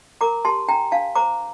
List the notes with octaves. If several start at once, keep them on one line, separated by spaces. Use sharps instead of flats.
A#4 A#5 D6
G4 A5 C6
D4 G5 A#5
D4 F5 A5
C5 A#5 D6